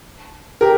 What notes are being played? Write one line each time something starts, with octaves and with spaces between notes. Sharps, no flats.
G4 A#4